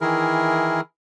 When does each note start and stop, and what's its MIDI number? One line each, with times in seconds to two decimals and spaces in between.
0.01 0.81 51
0.01 0.81 52
0.01 0.81 64
0.01 0.81 68
0.01 0.81 70